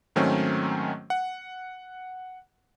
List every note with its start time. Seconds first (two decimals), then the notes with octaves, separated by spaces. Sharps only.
0.16 G#2 D#3 F#3 A3 C4 C#4
1.10 F#5